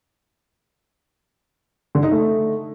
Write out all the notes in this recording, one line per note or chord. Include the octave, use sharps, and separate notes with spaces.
D3
D#4
A3